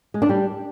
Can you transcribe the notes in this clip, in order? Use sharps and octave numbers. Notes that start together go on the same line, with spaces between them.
G#3
D4
G3